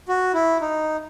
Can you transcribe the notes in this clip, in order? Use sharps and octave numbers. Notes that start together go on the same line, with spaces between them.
F#4
E4
D#4